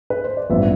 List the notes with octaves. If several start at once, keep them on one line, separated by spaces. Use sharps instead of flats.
B4
C5
D5
A1 G2 F3 B3 E5